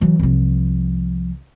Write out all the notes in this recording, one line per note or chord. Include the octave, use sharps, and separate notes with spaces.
E3 F#3
C2 F3